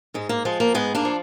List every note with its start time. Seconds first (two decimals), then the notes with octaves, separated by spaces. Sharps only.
0.14 G#2 G#3
0.29 A#3
0.45 F3 G#3
0.60 A#3
0.74 G#2 G#3 B3
0.95 A#3 D4
1.05 F3